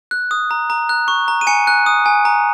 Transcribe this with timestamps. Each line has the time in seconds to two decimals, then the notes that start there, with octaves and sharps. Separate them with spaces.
0.11 F#6
0.31 D#6
0.51 A#5
0.70 A#5
0.89 F#6
1.08 C#6
1.28 A#5
1.41 D#7
1.47 G#5 C#7
1.67 F#6
1.86 D#6
2.06 G#5
2.25 A#5